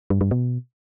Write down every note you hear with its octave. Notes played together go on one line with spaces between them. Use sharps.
G2
G2
B2